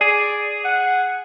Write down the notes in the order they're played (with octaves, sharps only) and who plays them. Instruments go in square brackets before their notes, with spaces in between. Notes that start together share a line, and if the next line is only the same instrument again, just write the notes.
[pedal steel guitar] G#4 [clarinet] D5
[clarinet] F#5